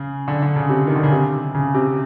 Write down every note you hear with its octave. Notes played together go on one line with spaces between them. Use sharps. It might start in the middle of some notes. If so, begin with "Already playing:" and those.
Already playing: C#3
D3
D3
C#3
C3
D#3
D3
C#3
C3
C#3
C3